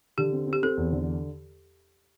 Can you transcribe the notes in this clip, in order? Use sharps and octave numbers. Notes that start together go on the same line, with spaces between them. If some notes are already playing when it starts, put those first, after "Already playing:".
D3 G4
C4
C4
G4
C4 A4
E2
D3